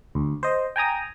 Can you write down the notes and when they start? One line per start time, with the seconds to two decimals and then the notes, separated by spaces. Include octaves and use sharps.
0.15 D2
0.43 C5 D#5
0.76 G5 G#5 A#5 D#6